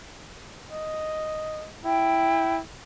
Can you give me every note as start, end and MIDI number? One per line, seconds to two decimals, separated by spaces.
0.71 1.68 75
1.85 2.61 64
1.85 2.55 79